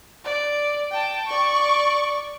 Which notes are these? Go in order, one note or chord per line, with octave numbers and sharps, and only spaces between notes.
D5
G5 A5
D5 C#6